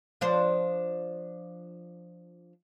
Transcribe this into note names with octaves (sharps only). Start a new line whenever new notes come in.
F3 D4 C5